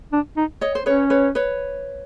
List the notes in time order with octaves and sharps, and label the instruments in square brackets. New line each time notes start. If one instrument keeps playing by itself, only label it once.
[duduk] D4
D#4
[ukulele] C#5 D#5
C5
[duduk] C#4 [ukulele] B4 C#5
[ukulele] B4 C#5
B4 C#5